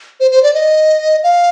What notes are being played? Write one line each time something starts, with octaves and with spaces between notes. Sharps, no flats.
C5
C5
D5
D#5
F5